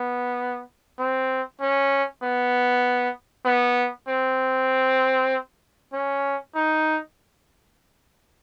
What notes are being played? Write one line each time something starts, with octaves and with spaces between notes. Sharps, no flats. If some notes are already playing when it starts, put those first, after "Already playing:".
Already playing: B3
C4
C#4
B3
B3
C4
C#4
D#4